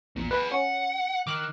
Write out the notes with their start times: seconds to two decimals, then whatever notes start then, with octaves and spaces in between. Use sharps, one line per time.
0.16 A#1 E2 A#2
0.31 G#4 B4 D5
0.52 C#4 F#5
1.27 D#3 D6 F6 F#6